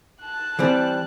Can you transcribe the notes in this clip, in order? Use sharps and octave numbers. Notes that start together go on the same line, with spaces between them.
A5 F#6
E3 G3 C4